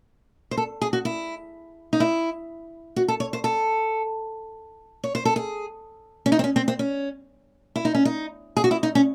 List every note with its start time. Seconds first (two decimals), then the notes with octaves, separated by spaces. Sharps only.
0.51 C5
0.57 A4
0.82 G#4
0.93 F#4
1.05 E4
1.93 D#4
2.00 E4
2.96 F#4
3.08 A4
3.20 C#5
3.33 C5
3.44 A4
5.04 C#5
5.15 C5
5.25 A4
5.36 G#4
6.26 C#4
6.32 D#4
6.39 C4
6.44 C#4
6.56 C4
6.68 C4
6.79 C#4
7.76 E4
7.85 D#4
7.95 C#4
8.05 D#4
8.57 G#4
8.64 F#4
8.71 E4
8.83 D#4
8.95 C#4